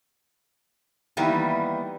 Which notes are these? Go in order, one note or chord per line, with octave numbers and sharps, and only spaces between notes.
D#3 E3 G3 A#3 B3